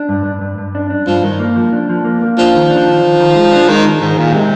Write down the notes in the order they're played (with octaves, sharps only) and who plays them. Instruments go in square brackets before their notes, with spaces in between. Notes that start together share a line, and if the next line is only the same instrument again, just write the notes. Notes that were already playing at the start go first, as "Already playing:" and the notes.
Already playing: [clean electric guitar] D4
G2
G2
G2
G2
D4
D4
[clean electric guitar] G2 [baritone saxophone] F3
[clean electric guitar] G2 [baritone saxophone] D#3
[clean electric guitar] A#3
F3
D4
F3
A#3
A#3
[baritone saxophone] F3 [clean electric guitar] D4
[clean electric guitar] D#3
D4
D#3
D#3
D#3
G#3
D4
[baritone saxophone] D#3 [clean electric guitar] G#3
[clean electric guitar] D#3
[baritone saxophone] G#2 [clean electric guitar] D#3
[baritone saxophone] A#2 [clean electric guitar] D#3
[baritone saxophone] C3 [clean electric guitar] G#3